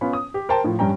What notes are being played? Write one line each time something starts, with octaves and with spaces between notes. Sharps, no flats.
B3 C#4 F4 B5
D#6
G4
A#4 C5 G5 A5
A2 F3
G2 G3 C#4 G5 A#5